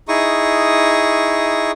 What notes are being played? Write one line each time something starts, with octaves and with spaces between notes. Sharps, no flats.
D#4 E4 G#4 C#6 D#6